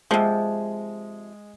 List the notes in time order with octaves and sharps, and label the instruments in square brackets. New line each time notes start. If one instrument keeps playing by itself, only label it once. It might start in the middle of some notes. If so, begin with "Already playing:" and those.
[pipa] C3 F3 [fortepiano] G#3